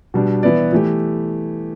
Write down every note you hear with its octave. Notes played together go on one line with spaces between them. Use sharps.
B2 G3 D4
E3 B3 E4 B4 D5
E3 A3 G4